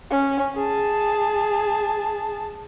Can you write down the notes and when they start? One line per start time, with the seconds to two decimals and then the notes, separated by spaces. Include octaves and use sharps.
0.10 C#4
0.55 G#4 A5